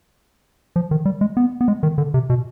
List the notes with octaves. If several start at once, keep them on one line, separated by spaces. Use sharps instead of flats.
F3
D#3
G3
G#3
B3
B3
G#3
D#3
D3
C3
B2